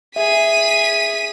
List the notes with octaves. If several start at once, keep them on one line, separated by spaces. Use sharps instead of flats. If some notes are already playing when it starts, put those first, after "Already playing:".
G#4 E5 B6 D#7